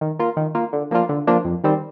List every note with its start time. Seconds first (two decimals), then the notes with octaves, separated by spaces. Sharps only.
0.01 D#3
0.19 A#3 F4
0.37 D#3
0.55 A#3 F4
0.73 D3
0.91 F3 A#3 D4 F4
1.09 D3
1.27 F3 A#3 D4 F4
1.45 F2
1.64 D#3 G3 C4